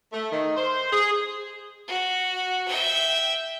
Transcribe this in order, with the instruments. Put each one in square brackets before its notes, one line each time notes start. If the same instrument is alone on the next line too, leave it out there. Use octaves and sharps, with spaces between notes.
[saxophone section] A3
D#3
C5
G#4
[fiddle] F#4
E5 G5